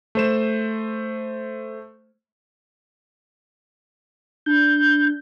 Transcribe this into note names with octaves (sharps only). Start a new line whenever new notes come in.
A3 C5 E7
D4 G6